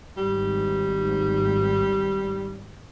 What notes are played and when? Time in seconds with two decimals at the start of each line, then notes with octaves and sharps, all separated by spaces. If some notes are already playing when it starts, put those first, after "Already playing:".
0.17 G#1 G#2 G3